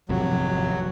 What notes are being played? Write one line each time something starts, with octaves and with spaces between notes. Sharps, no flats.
G#1 F2 C3 F#3